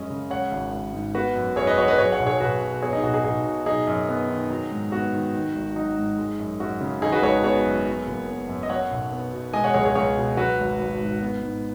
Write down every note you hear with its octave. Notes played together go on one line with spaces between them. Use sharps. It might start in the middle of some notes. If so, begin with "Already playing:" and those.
Already playing: F#2 G#3 C#4 D#5
C#3
G#3 C#5 F#5
G#1
G#1
G#2
B3 F#4 B4
F#2
F#2 G#4 C#5
B4 D#5
F#3 C#5 F#5
B4 D#5
F#3 G#4 C#5
C#5 F#5
B1
G#4 C#5
B1 F#4 B4
B2
B3 G#4 C#5
D#4 G#4
B1 F#4
D#4 G#4
B1 D#4 G#4
B2
F#3 D#4 G#4
F#2
B3
D#3
F#3
G#2
B3 F#4
D#3
D#3
G#1
F#3 D#4
G#2
G#3
F#2
F#2 F#4
C#3
D#3 D#4 G#4
F#4 B4
G#1 G#4 C#5
B3 G#4 C#5
F#2
F#3
F#1
B3
F#2
D#5
F#3 C#5 F#5
B1
B3
B2
G#3 D#5 G#5
C#5 F#5
C#2 G#4 C#5
G#4 C#5
C#2 G#4 C#5
B2
F#3 F#4 B4
G#1
G#1
G#2
B3
G#2